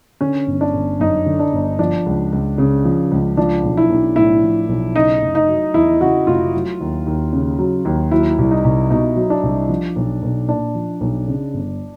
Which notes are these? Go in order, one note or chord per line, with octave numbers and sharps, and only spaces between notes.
D3 C#4
G1
D4
G1
F#2 D#4
D3
D4
G1
F3 D4
C#2
C#2
C#3
F3
C#2
F3 D4
B1
E4
B1
A2 E4
F3
B1
C#3 D#4
F1
D#4
F#3
E2 E4
C#3 F#4
F1 F4
F#3
D#2
D#2
C#3
F#3
D#2
F#3 E4
C2
D#4
C2
B2 D#4
F#3
D4
C2
F3
B1
B1
A#2 D4
F3
B1
C#3
G1